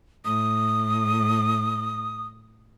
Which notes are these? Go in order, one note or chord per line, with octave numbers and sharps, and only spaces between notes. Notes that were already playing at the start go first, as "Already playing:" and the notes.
A2 D#6